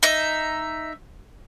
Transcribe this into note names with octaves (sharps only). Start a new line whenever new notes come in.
D#4 E5